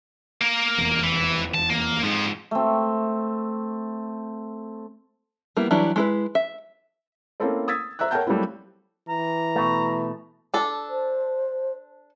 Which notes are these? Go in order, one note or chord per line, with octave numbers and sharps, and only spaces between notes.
A#3 A#4
F1 E2
E3
A5
A#3
F2 G#2 F3
A3 C4
G3 A#3 B3 E4
E3 F#3 G3 D4 E4
G#3 E4 B4
E5
A#3 C4 C#4 E4 A4 C5
D#6 E6 G#6 A6 B6
C5 E5 A#5 E6 F#6
A#4 C#5 F#5 G5 A5 G6
F#3 G3 A3 A#3 C4 E4
E3 A#5
B2 A3
D4 A4
C5